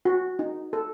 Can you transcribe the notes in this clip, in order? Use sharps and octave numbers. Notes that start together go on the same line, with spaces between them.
F#4
D#4
A4